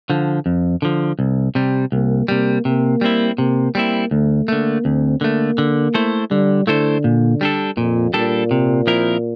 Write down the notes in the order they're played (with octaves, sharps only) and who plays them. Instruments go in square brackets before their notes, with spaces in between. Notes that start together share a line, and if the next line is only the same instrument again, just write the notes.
[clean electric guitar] D3 F3
F2
D3 F3
C2
C3 G3
[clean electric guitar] C2 [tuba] A#3
[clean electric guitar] C3 G3 [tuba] A#3
[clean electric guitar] C3 [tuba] A#3
[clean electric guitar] G3 C4 E4
[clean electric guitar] C3 [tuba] A#3
[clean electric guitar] G3 C4 E4 [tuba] A#3
[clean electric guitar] D2 [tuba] A3
[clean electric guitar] D3 A3 [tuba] A#3
[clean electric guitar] D2 [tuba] C4
[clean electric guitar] D3 A3 [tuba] A#3
[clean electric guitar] D3
A3 E4 A4 C5
[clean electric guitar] D3 [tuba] G3
[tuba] D3 [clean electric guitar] A3 E4 A4 C5
[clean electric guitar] A#2
G3 D4 A4
[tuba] F2 [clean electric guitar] A#2
[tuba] A#2 [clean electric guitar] G3 D4 A4
[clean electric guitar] C3
F3 C4 E4 A#4